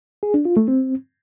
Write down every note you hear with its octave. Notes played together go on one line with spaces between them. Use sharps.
G#4
D4
F4
A3
C4